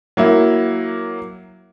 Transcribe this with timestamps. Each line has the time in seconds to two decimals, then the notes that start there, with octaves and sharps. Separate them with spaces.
0.17 F#3 A#3 E4